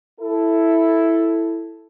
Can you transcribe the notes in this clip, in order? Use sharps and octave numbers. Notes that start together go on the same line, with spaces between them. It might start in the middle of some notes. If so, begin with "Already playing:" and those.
E4 A4